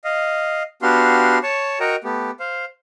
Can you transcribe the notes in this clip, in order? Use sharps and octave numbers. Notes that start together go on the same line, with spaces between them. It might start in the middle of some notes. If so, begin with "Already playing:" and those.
D#5 F5
B3 D4 F#4 G4 F5 C6
C#5 A5 C#6
F#4 A#4 D#5 G5 A#5 C#6
A3 B3 G4
C5 F5